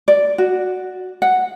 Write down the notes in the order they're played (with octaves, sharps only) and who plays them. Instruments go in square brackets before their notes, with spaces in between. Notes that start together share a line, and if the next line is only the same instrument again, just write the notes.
[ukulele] D5
F#4
F#5